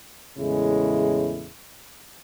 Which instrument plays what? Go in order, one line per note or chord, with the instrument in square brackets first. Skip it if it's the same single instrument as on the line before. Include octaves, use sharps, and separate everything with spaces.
[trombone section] E2 A2 C#3 G#3 A3 E4